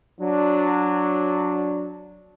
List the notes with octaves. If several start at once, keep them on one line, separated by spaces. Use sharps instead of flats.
F#3 D4